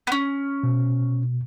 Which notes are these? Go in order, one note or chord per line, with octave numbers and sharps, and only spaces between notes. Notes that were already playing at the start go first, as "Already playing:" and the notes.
B3 C#4
B2